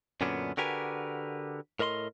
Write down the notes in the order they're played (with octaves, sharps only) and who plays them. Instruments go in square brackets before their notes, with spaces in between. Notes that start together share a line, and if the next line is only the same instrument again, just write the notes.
[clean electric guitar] F#2 A#2 D3 B3 C#4 D4
D3 F#4 G4 A#4 B4 G#5
A2 A#4 D#5 B5 C6